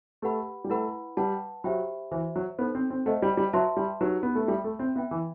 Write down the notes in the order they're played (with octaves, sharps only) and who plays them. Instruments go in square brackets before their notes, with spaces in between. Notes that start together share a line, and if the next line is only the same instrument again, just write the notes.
[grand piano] A3 [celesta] G4 B4 F#5 B5
[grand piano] G3
[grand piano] A3 [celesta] E4 B4 F#5 B5
[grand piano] G3 [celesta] B4 F#5 A5
[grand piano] F#3 [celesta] G4 C5 E5 G5 B5
[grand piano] E3 [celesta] F#4 C5 E5
[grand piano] F#3
[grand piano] B3 [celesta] D#4 A4 C5
[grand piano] C4
C4
[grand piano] A3 [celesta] C5 D#5 F#5
[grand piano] G3
G3
[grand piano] F#3 [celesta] B4 E5 A5 C6
[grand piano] G3
[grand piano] F#3 [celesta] D#4 G4 B4
[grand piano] B3
A3
[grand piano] G3 [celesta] A4 E5 G5 B5
[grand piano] A3
C4
[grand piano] B3 [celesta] B4 E5 G5
[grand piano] E3